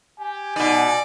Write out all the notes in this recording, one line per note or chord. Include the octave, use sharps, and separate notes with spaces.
G4 G#5
B2 D#4 D5